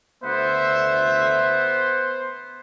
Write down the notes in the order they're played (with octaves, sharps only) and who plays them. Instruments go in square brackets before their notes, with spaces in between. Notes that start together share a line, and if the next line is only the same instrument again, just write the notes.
[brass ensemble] D2 E5 [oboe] B3 [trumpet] C5